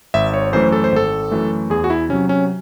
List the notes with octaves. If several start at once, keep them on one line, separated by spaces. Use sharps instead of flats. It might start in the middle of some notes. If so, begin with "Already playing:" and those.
G#1 E5
C#5
F#2 E3 A3 C5
A4
C5
G#1 A4
F#2 E3 A3
E2 G#4
F#4
E4
C3 F#3 C#4
C#4